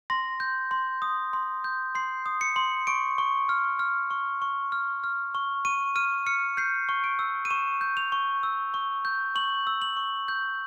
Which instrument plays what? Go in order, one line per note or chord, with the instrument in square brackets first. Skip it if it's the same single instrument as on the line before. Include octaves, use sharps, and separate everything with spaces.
[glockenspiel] C6 A#6
G6
C6
D#6
C6
G6
C6 C7
D#6
C#7
C6
C#6 D7
C#6
F6
F6
C#6
C#6
F6
F6
C#6
C#6 D#7
F6 D#7
F6 C#7
G6 C7
C#6
D7
E6
D#7
C#6 E7
G6
F7
C#6
E6
C#6
G6
C#6 F#7
E6
F#7
C#6
G6